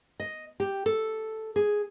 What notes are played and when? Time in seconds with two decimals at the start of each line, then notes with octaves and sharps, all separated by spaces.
0.20 D#5
0.60 G4
0.86 A4
1.56 G#4